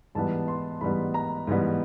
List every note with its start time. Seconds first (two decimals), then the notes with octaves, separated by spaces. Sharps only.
0.15 G#2 E3 G3 B3 A5
0.48 C6
0.81 G#2 E3 G3 B3 B5
1.14 A#5
1.47 G#2 E3 G3 B3